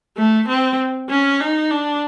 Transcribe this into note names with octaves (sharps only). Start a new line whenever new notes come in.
A3
C4
C#4
D#4
D4